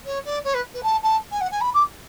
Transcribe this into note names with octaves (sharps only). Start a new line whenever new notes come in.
C#5
D5
C#5
B4
B4
A5
A5
G#5
F#5
G#5
B5
D6